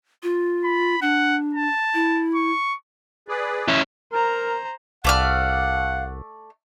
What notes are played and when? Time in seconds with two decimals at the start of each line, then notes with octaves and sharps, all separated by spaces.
0.23 F4
0.64 B5
1.02 D4 F#5
1.55 A5
1.94 E4
2.35 C#6
3.28 G#4 B4 D5
3.68 C#4 E4
4.12 A#4 C5 A#5
5.04 C2 A3 D5 F5 F#5 F6